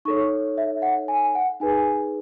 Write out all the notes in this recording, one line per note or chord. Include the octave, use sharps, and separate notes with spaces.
D#4 A4 C#5 C#6
E5
F#5
G#5
F#5
D#4 G#4 B4 G#5